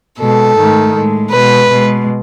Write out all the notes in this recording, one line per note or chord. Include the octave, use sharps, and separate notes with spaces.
B2 G#3 A4
G#2 D#3 A3
A2 G#3
B2 G#3 B4
B2 G#3